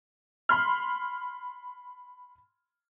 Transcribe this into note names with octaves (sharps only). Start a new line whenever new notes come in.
B5 C6 F6